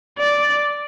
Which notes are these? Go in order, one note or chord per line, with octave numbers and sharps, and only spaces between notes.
D5